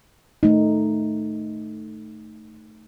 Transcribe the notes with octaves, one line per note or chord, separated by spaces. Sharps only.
A3 D#4